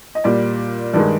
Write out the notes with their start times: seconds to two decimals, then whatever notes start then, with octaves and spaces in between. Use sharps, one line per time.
0.15 D#5
0.24 A#2 G3 D5
0.93 G2 D#3 G#3 D5